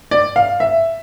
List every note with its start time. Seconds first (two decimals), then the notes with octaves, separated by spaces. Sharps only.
0.11 D5
0.36 F5
0.60 E5